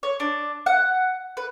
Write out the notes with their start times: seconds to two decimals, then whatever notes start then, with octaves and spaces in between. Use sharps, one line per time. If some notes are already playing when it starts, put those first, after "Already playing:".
0.03 C#5
0.20 D4
0.66 F#5
1.37 B4